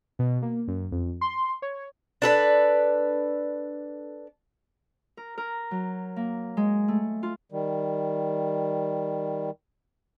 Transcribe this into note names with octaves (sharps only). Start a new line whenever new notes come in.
B2
A#3
F#2
F2
C6
C#5
D4 A4 B4
A#4
A#4
F#3
A#3
G#3
A3
F4
D#3 G3